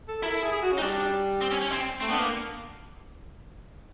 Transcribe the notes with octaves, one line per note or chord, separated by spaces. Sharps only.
A4
E4 A#4
A4
G#4
G#4
F#4
C#4
D#4
G3 D4
C4
C#4
C#4
C4
A3 C4
B3 D4
A#3